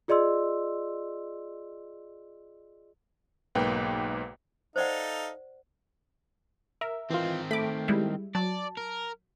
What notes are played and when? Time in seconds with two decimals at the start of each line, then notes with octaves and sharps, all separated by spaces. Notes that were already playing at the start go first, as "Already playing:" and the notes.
0.08 F4 G#4 D5 D#5 C6 E6
3.55 B1 G#2 A#3 B4 G5
4.76 D#4 A4 C5 D5 F5 F#5
6.81 A#4 E5
7.10 D#3 E3 C4 F4
7.51 A3 B5 D6
7.88 G3 G#3 E4
8.35 F#3 D5 A5
8.77 A#4